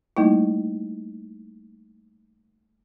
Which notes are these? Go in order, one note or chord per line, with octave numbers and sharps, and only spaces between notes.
G3 A3 A#3 D#4 E4